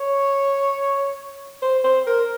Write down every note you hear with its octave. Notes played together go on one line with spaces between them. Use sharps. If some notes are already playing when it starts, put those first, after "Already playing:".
Already playing: C#5
C5
C5
A#4